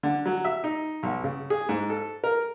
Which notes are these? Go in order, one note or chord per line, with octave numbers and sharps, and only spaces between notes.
D3
F#3
E5
D#4
B1
C#3
G#4
G#2
A4
A#4